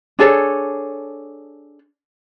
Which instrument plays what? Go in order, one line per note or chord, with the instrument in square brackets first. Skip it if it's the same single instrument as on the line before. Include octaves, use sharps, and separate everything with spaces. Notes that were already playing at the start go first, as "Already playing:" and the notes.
[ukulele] D4 G#4 A4 C#5